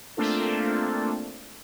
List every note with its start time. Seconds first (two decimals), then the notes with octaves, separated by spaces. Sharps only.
0.17 A3 A#3 C4 D4 F4 A4